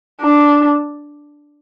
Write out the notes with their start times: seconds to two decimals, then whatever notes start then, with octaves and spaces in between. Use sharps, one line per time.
0.21 D4